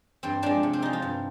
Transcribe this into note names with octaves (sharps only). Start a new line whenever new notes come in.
G2 C4
F3 G#3 D4
C3
C4
F3 G#3 D#4
F4
G2